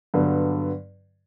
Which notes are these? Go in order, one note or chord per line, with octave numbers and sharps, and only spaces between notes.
G2 D3 F#3 B3